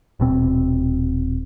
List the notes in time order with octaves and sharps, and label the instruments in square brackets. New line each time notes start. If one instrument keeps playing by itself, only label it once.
[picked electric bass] D#1 B2 C4